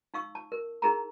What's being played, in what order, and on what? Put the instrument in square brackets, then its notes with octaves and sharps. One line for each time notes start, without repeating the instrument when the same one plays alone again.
[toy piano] D#4 F5 C#6 E6
A5
A#4
D#4 E4 G#4 A#4 A5 A#5